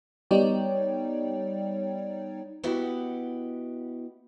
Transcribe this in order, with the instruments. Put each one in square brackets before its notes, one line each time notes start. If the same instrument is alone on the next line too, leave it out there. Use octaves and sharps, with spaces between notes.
[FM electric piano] G3 B3 D#4 C#5 D5 G5
[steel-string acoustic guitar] B3 E4 F#4 G4 D#5 F#5